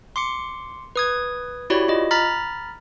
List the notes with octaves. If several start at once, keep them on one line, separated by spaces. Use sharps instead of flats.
C6 D6 C#7
B4 D#6 G#6
E4 F#4 G4 C#5 D5 B5
F4 D#5
A#5 B5 F6 A6 B6